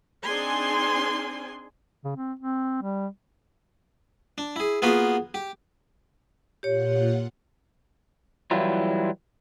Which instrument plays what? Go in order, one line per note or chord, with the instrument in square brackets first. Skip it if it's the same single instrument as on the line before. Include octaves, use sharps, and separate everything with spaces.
[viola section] C4 D4 D#4 G#4 G#5 C6
[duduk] C#3
C4
C4
G3
[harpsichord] D4
E4 G#4
A#3 B3 F4 F#4 G#4 B4
G4
[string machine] A#2 F4 F#5 [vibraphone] G4 C#5
[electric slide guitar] E3 F#3 G3 E4 F4